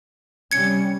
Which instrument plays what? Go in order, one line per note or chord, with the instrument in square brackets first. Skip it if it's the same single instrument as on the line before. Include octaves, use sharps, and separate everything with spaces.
[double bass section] C3 G3 C#4 [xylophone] G#6 C#7